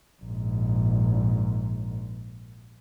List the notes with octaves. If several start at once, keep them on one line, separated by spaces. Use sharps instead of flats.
A#1 G#2